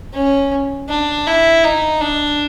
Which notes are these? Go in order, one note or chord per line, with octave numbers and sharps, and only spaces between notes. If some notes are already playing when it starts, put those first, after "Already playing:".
C#4
D4
E4
D#4
D4